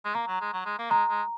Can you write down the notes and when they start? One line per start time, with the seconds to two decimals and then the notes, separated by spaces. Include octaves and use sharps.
0.05 G#3
0.15 A#3 A#5
0.28 F#3
0.41 G#3
0.53 F#3
0.66 G#3
0.79 A#3
0.90 G#3 A#5
1.09 G#3